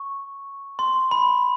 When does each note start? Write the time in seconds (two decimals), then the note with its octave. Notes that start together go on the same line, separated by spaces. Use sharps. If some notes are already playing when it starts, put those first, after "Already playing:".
Already playing: C#6
0.79 C6
1.11 B5